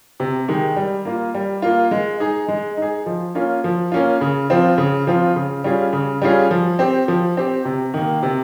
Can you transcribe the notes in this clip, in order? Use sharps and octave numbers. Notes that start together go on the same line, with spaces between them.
C3
D#3 G#3 D#4 G4
G3
A#3 F4
G3
A#3 F4
G#3
D#4 G#4
G#3
D#4 G#4
F3
A#3 C#4 F4
F3
A#3 C#4 F4
C#3
F3 C4 F4
C#3
F3 C4 F4
C#3
G3 C#4 F4 G#4
C#3
G3 C#4 F4 G#4
F3
C4 G4
F3
C4 G4
C3
D#3 A#3
C3